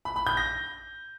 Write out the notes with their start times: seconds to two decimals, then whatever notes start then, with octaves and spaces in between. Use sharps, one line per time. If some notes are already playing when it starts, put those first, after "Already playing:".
0.05 B5
0.16 B5
0.27 G6
0.37 A#6